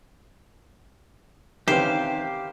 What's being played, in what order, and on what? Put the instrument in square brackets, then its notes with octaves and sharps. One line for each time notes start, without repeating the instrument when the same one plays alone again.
[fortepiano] C3 E3 C#4 [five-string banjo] D#3 [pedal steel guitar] G4 F5 [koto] C5